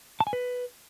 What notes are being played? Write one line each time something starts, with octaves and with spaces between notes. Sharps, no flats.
A5
G#5
B4